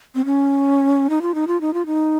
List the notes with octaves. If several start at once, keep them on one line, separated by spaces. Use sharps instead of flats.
C4
C#4
D#4
F4
D#4
F4
D#4
F4
D#4